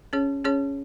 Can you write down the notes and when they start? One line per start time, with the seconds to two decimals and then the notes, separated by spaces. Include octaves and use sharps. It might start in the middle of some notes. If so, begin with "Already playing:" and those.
0.13 C#4 G#4 C#5
0.44 C#4 G#4 C#5